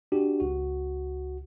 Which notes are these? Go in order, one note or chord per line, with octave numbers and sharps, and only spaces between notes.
D4 F#4 G4
C#2 F#4